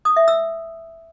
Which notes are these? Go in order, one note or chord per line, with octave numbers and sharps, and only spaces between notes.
D#6
E5
E6